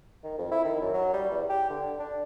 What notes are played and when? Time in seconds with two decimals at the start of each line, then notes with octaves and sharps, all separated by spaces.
0.24 D#3
0.38 F2
0.52 E4
0.65 D#3
0.81 F#2
0.94 F#3
1.13 G3
1.31 E2
1.49 G4
1.70 D3
1.99 D4